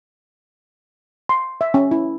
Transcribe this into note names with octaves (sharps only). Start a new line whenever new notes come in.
C6
E5
C#4
E4